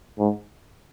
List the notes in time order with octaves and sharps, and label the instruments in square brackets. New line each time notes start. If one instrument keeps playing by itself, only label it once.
[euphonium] G#2